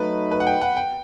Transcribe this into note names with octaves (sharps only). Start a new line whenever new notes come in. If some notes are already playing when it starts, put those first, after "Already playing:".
Already playing: F#3 A3 D#4 B4
B4
F#5
G5
F#5
G5